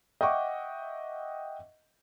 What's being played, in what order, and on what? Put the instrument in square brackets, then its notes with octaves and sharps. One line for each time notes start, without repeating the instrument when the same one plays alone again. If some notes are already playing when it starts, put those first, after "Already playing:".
[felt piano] D#5 E5 F#5 G5 C#6 D6